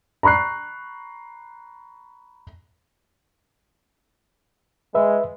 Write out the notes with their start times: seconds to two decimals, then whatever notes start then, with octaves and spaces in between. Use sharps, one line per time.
0.23 A#5 B5 C#6 F#6 C7
4.95 G#3 B4 E5